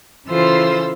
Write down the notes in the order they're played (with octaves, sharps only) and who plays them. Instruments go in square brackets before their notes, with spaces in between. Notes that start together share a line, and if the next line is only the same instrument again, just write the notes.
[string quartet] C#3 E3 F4 A4 C5 E6